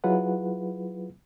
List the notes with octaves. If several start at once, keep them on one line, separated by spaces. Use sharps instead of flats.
F#3 E4 F4 G#4 B4 F#5